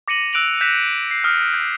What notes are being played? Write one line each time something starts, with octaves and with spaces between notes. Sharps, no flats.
D6 A#6 C#7 D#7 F#7
E6 F#6 D7 F7 F#7
F#6 G6 A#6 B6 E7
C7
D#6 F6
G6